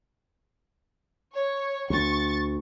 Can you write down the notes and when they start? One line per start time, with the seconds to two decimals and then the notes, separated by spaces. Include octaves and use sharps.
1.34 C#5
1.90 D2 C#6 A6